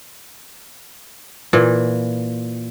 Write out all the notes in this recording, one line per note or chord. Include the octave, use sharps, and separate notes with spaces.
A#2 E3